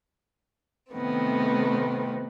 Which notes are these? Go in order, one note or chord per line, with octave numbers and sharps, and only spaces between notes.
A2 C3 D#3 A3 B3 C4